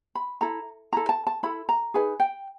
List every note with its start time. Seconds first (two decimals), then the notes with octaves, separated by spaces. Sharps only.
0.15 B5
0.41 E4 A4 A#5
0.93 E4 A4 A#5
1.09 A5
1.27 A5
1.43 E4 A4 B5
1.69 A#5
1.94 D#4 G#4 B4 G#5
2.20 G5